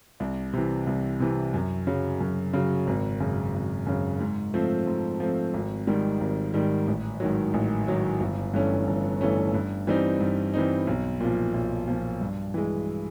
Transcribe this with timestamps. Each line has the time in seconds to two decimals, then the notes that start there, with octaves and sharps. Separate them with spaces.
0.20 C2
0.53 C3 E3
0.87 C2
1.20 C3 E3
1.54 F#2
1.87 C#3 F#3
2.21 F#2
2.53 C#3 F#3
2.87 G#1
3.20 F#2 C#3
3.54 G#1
3.87 F#2 C#3
4.20 G#2
4.54 F3 A3 C4
4.87 G#2
5.20 F3 A3 C4
5.54 G#1
5.87 G#2 D#3 G3
6.21 G#1
6.54 G#2 D#3 G3
6.88 A1
7.20 G#2 D#3 F#3
7.54 A1
7.87 G#2 D#3 F#3
8.20 G1
8.54 G2 E3 A3 C#4
8.87 G1
9.21 G2 E3 A3 C#4
9.54 G2
9.87 E3 G3 C4 D#4
10.21 G2
10.54 E3 G3 C4 D#4
10.87 B1
11.21 A#2 F3
11.54 B1
11.88 A#2 F3
12.21 G2
12.54 E3 G#3